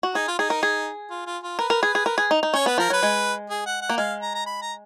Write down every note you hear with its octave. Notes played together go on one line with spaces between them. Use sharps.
F#4
D#4 G#4
F4
D#4 G#4
A#4
G#4
F4
F4
F4
A#4 B4
A#4
G#4
G#4
A#4
G#4
D#4
D#4
C#4 C#5
B3 B4
F3 A#4
F#3 B4
G#3
G#4
F#5
F#5
A#3
G#3 F5
A#5
A#5
B5
A#5